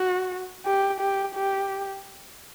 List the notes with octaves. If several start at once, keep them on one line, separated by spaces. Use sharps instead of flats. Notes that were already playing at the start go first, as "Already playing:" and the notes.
Already playing: F#4
G4
G4
G4